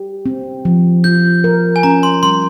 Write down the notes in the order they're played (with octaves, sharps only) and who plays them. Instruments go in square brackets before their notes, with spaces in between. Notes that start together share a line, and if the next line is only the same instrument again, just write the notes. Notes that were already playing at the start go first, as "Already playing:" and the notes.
Already playing: [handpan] G4
C4
F3
[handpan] F4 [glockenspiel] G6
[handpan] A#4
[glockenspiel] G#5
[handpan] C#4 [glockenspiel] A#5
[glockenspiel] C6
[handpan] G3 [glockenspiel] C6